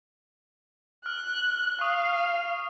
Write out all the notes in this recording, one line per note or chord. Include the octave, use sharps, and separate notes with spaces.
F6 F#6
F5 C#6 D#6